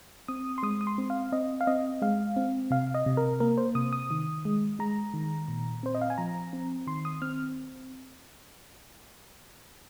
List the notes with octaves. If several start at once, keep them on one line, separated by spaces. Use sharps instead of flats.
C4 D#6
C6
G#3 D#6
D#6
C6
C4
F5
C4 D#5
F5
C4 D#5
G#3 F5
C4
C3 F5
D#5
C3
A#4
A#3 A#4
C5
C3 D#6
D#6
D#3
G#3
G#3 A#5
D#3
A#2
C4 C5
D#5
F5
G#5
F3 A#5
C4
D#3 C6
D#6
C4 F6